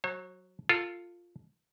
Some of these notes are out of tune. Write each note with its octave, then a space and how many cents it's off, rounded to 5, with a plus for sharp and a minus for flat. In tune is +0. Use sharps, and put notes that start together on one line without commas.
F#3 +0 C#5 -45
F4 +0 A4 +25